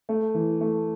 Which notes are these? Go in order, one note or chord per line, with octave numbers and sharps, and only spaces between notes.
A3
E3
A3